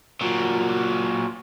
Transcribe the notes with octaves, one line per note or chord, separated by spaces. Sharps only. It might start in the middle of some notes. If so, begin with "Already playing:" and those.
A#2 F#3